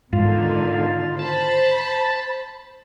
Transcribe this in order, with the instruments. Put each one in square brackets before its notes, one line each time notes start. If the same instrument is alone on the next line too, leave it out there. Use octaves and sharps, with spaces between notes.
[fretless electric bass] G#2 [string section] B2 D3 D#3 [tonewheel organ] F4
[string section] C5 B5 [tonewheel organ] A5